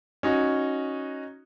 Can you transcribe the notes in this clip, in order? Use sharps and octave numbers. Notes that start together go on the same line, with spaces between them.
C#4 D#4 F#4